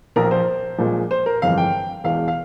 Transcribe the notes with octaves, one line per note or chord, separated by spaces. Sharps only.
A#1 A#2 F3 A#4
C5
A#1 A#2 F3 G#3
C5
A#4
G1 F2 E3 G#3 F5
G5
E1 E2 E3 G#3 F5
F5